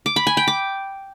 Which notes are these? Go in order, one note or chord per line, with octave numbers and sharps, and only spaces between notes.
D6
B5
G#5
G5
D6